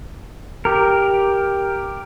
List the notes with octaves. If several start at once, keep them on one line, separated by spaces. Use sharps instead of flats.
G4 A#4